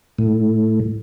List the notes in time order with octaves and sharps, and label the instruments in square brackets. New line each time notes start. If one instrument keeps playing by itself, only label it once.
[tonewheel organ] A2